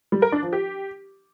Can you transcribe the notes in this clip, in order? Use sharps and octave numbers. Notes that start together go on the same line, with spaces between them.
G3
A#4
D4
F3
G4